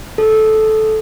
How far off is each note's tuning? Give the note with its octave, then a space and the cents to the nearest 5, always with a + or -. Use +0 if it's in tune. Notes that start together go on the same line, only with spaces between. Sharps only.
A4 -15